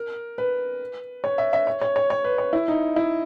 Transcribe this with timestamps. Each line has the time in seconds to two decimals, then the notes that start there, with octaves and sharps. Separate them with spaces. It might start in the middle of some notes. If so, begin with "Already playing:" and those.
Already playing: A#4
0.38 B4
1.24 C#5
1.38 E5
1.53 E5
1.67 C#5
1.81 C#5
1.96 C#5
2.10 C#5
2.24 B4
2.38 C#5
2.53 E4
2.68 D#4
2.96 E4